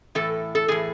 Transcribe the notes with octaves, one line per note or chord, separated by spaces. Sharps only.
A2 E3 A4
A4
A2 E3 G#4